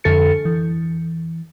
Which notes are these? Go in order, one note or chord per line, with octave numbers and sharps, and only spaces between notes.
F2 D3 A4 A6 C#7
E3